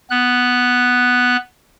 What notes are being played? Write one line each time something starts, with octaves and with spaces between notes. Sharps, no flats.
B3 F#6